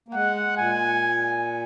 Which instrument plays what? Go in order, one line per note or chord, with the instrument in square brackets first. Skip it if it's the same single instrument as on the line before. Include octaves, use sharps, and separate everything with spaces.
[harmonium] A#3
[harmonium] G#3 [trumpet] F#5
[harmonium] A#2 [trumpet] G#5